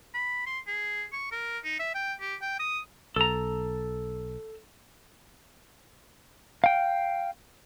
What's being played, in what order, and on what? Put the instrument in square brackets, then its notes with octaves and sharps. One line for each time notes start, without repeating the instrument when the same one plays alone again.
[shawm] B5
C6
G#4
C#6
A#4
D#4
E5
G5
G4
G5
D#6
[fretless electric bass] B1 [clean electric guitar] A4 A#5
[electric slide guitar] F5 G5